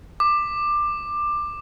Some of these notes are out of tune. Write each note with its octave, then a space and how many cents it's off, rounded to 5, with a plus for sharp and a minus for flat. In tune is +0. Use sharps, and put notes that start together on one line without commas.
D6 +15